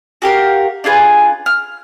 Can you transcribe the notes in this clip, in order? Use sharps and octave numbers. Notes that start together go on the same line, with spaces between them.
F#4 G4 A#4 F5
D4 F4 G#4 B4
F6